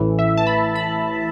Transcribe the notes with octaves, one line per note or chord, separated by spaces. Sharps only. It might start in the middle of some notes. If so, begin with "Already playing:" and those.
Already playing: A1 A2 E3
E5
A5
B5
B5